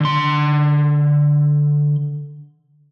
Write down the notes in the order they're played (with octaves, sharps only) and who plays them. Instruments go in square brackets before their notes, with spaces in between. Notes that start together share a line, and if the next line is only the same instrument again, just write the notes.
[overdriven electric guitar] D3 C6